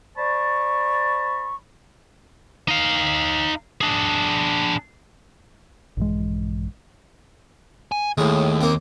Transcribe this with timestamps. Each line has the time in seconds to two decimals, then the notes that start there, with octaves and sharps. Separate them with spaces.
0.17 C5 D5 A5 B5 C#6
2.68 D#4 F5
3.81 D4 G#4
5.97 A#1 G2 E3 G#3
7.92 G#5
8.18 D#2 A2 G#3
8.61 A#3 C4